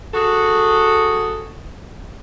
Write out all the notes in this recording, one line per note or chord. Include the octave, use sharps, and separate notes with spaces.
F#4 G#4 A4